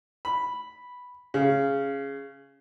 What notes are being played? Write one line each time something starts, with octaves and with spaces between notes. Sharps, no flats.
B5
C#3